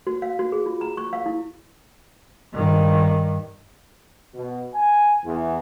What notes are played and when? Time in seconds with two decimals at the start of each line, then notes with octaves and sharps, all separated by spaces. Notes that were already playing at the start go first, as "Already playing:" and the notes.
0.07 F#4
0.22 F5
0.39 F#4
0.52 G#4
0.66 F4
0.81 A#5
0.97 C#6
1.13 F5
1.26 E4
2.54 G2 D#3
4.34 B2
4.74 G#5
5.24 E2